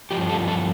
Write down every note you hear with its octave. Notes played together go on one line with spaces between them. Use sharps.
G2 F3 G4
A4
A4